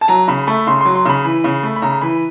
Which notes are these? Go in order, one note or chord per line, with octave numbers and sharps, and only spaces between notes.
A5
F#3 A#5
C#3 B5
A3 B5
C#3 C6
F#3 C6
C6
C#3 B5
E3
C#3
A3
B5
C#3 A#5
E3 B5